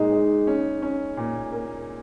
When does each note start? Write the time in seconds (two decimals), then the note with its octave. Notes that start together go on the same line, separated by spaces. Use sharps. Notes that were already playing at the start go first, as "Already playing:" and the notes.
Already playing: A#2 G#3 D#4
0.12 G#3
0.47 C#4
0.82 C#4
1.17 A#2
1.52 A#3